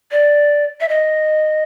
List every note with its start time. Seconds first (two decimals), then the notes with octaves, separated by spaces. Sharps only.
0.12 D5
0.80 E5
0.89 D#5